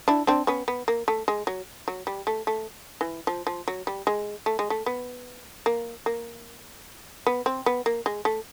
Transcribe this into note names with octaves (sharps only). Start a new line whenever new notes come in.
D4 E4
C4 D4
B3 C#4
B3
A#3
A3
G#3
F#3
F#3
G3
A3
A3
E3
F3
F3
F#3
G3
G#3
A3
G#3
A3
B3
A#3
A#3
B3
C4
B3
A#3
G#3
A3